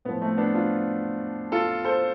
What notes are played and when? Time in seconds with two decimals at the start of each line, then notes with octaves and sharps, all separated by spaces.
0.05 A2 B3
0.09 F3
0.21 A3 C4
0.37 B3 D4
0.55 D4 F4
1.52 F4 A4
1.85 A4 C5